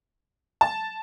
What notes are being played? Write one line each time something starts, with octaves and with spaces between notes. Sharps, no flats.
A5